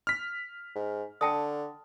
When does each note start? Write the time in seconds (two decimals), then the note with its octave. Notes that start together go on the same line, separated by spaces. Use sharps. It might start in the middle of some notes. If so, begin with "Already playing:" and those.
0.07 F6 B6
0.75 G#2
1.21 D3 G5 A5 D#6